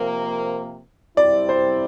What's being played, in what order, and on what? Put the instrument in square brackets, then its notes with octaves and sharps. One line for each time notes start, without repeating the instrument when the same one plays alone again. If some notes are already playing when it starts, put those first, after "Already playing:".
Already playing: [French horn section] C3 F3 A#3
[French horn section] C3 G3 C4 E4 [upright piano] D5
[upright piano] C5